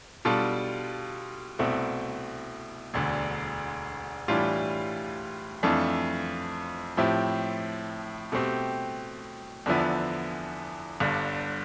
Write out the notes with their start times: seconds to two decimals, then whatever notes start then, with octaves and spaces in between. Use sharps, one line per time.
0.25 B2 G3 D4 F4 A4
1.59 C2 B2 A3 C4 E4
2.94 E1 D2 D3
4.28 A2 E3 G3 D4 F4
5.63 F2 E3 A3 D4 F4
6.97 A2 F3 C4 E4 G4
8.32 B2 A3 C4 G4
9.66 E2 D3 F3 B3 E4
11.00 G1 G2 D3